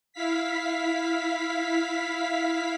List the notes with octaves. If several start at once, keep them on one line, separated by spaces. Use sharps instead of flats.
E4 F5 B6